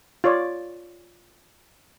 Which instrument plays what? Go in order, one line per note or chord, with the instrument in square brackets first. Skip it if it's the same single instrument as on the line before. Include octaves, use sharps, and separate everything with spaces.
[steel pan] F4 C#5 D5